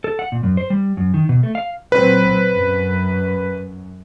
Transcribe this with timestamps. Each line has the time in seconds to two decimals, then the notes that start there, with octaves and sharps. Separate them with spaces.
0.04 A4
0.19 F#5
0.32 A#2
0.43 F#2
0.57 C5
0.70 G3
0.97 F#2
1.14 D#3
1.29 B2
1.43 A3
1.55 F5
1.92 A#2 F#3 C4 B4
2.53 F#2